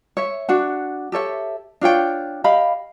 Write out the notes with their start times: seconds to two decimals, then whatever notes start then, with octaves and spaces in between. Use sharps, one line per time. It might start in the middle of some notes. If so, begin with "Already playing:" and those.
0.17 C#5 E5
0.49 D4 F#4 F#5
1.12 G4 A4 C#5 E5
1.81 D4 F4 C#5 G5
2.44 G4 D#5 F5 B5